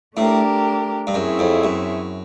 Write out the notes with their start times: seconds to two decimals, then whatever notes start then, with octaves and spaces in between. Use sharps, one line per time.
0.17 A2 A3 D4 G4 A#4
1.07 G2
1.14 F#2 C4 E4 G#4 C#5 E5
1.39 F2
1.64 F#2